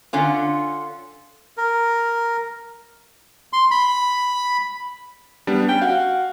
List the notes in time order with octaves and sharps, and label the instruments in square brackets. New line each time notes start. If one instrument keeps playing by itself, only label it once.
[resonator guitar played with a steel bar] D3 C#4 F4
[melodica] A#4
[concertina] C6
B5
[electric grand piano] G3 B3 D4
[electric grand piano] C#4 [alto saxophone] G5
[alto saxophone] F#4 [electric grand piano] F5